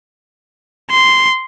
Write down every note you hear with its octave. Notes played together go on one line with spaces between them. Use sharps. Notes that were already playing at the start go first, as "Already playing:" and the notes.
C6